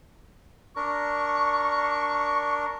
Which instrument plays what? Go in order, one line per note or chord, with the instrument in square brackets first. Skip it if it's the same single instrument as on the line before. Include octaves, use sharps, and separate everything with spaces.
[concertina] D4 A#4 [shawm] C#6